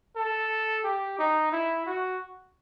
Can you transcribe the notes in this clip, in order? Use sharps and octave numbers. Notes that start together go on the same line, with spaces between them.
A4
G4
D#4
E4
F#4